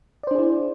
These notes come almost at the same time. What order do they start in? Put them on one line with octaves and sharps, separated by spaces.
D5 C5 D4 G#4 E4